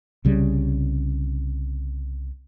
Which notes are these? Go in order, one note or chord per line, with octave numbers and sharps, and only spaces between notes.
C2 C#3 G3